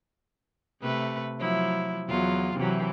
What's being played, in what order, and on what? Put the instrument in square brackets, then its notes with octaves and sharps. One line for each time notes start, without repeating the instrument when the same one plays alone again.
[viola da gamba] C3 A3 B4
F3 F#3 E4
E2 F#3 F4
C3 E3 F#3